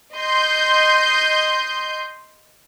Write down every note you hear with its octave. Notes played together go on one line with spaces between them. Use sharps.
D#5 C6 G6